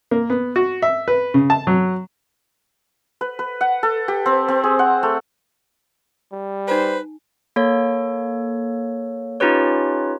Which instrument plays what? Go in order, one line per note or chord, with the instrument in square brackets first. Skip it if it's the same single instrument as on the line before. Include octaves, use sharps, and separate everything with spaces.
[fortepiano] A#3
B3
F#4
E5
B4
C#3
A5
F#3
[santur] B4
B4
F#5
A4
G4
C4
C4
G#4
F#5
A3
[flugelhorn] G3
[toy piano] D#4 G#5 [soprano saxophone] B4 [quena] C5
[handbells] A#3 A4 C#5
C#4 D#4 F4 G4 B4 C#5